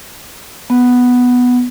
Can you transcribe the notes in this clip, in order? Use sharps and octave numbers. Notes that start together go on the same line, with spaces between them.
B3